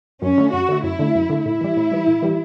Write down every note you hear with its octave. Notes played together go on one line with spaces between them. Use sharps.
F#2 C#4
D3 A3
F#2 F#4
D3 A3
F#2 E4
D3 A3
F#2
D3 A3
A2 E4
E3 G3
A2
E3 G3
A2
E3 G3